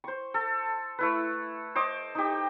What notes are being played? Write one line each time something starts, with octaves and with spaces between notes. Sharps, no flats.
C5 C#6
A4
A3 E4 B4
C5 D#5 D6
D#4 G4